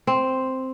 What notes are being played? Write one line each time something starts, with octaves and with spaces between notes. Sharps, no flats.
C4